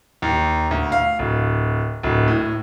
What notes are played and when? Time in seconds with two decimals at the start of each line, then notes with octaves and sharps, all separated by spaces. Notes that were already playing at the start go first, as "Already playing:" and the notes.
0.22 D#2
0.71 D2
0.92 F5
1.19 D1
2.03 D1
2.28 A2